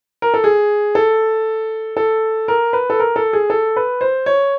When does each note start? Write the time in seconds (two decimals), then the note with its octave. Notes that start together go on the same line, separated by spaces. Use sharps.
0.22 A#4
0.34 A4
0.44 G#4
0.95 A4
1.97 A4
2.48 A#4
2.73 B4
2.90 A4
3.00 A#4
3.16 A4
3.33 G#4
3.50 A4
3.76 B4
4.01 C5
4.26 C#5